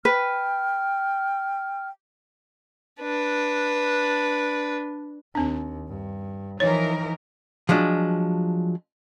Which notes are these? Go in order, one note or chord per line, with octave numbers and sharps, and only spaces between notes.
B4 G5 F6
D4 B4
D#2 C4 D4
G2
E3 F3 D#4 A#4 C#5
F3 F#3 G#3 D4